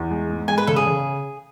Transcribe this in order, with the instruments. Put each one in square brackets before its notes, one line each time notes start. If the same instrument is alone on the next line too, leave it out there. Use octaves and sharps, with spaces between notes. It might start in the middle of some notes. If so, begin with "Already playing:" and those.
Already playing: [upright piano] E2
G#3
G#2
[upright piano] G#3 [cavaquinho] G#5
[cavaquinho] B4
[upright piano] C#3 [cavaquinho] A4
[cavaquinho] G#4
[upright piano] C#3